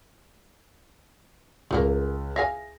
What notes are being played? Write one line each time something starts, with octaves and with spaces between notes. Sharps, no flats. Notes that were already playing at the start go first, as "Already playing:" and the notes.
C#2 A3 A#3 A#4
E5 F5 G#5 A#6